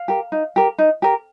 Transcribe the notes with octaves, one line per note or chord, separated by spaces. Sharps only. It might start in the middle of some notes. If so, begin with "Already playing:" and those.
Already playing: F5
G4 A#4
D#4
G4 A#4
D#4
G4 A#4